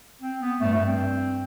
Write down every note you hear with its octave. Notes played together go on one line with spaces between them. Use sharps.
C4
B3
G2 A3
A3
C4